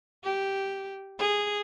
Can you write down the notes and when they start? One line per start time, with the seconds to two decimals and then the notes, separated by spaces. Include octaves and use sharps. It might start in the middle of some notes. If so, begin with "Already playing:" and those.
0.24 G4
1.19 G#4